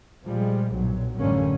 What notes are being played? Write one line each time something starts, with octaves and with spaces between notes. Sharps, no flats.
A#2 F3 G3 G#3
B1 G2 A#2 F#3
A1 F#2 D3 G3 A#3 C#4